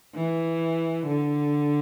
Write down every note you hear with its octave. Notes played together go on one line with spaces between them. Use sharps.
E3
D3